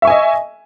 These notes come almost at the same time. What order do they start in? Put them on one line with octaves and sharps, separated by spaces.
E5 C#6 G#5 D#5